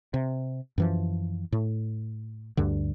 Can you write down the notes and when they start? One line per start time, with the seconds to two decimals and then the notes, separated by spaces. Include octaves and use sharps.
0.14 C3
0.78 F#2 E3 F3
1.52 A2
2.57 D2 G2 D3